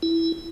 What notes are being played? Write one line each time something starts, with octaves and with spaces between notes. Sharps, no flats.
E4